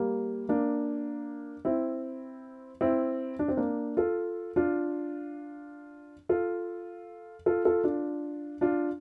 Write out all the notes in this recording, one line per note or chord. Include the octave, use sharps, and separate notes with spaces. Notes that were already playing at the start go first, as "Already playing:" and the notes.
Already playing: G3 A#3
A#3 D4
C4 E4
C4 E4
D4
C4
A#3 D4
F4 A4
D4 F4
F4 A4
F4 A4
F4 A4
D4 F4
D4 F4